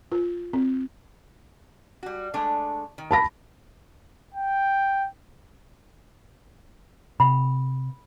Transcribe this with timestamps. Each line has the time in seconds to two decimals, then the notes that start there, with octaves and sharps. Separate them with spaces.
0.12 F4
0.53 C4
2.03 G3 F#4
2.34 G#3 A3 D4
2.98 D#3
3.11 A5 B5 A#6
4.34 G5
7.20 C3 B5